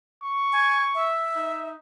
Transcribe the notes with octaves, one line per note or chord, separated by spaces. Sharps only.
C#6
G#5
E5
D#4